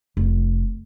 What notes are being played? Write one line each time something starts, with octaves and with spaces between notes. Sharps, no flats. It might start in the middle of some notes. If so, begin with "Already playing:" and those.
F1